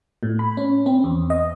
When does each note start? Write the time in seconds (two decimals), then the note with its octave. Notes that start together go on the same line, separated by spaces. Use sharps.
0.23 A2
0.39 B5
0.57 C#4
0.86 C4
1.04 E2
1.30 D#5